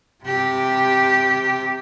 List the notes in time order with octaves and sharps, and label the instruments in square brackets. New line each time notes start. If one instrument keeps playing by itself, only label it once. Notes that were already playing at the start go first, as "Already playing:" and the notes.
[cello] C3 G4